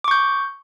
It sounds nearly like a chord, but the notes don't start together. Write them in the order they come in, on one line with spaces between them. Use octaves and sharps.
D6 C#6 G6